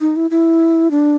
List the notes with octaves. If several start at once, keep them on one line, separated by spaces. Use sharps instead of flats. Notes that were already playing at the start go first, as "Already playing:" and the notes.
D#4
E4
E4
D4